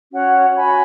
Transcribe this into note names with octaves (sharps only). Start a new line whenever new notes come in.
C#4 F#4 C#5 F#5
F#4 C#5 G#5 B5